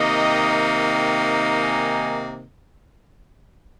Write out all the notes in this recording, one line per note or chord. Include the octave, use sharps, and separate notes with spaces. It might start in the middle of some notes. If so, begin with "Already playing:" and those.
Already playing: C3 D#3 A#3 D#4 D#5
G#5